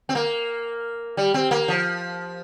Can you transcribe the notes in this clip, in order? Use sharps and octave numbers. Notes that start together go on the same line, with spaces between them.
C4
A#3
G3
C4
A#3
F3